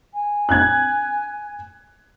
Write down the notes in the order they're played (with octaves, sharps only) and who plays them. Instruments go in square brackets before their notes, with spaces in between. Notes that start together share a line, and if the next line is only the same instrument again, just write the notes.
[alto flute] G#5
[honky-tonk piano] F#6 G#6